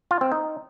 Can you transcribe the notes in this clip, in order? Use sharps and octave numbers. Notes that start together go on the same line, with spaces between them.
F4
C4
D#4